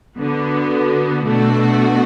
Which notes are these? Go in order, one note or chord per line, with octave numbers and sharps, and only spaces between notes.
D3 B3 F#4
B2 A3 D4 F#4